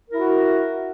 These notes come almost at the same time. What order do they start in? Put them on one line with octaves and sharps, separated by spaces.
A#4 E4 F#4